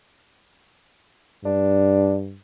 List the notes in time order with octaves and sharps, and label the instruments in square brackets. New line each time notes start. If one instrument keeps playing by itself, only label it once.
[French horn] G2 [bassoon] D4